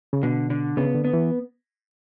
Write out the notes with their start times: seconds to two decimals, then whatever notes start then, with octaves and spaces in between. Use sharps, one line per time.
0.13 C#3
0.23 B2 D3
0.50 D3
0.77 C#3 B3
0.95 D3
1.05 B3
1.13 E3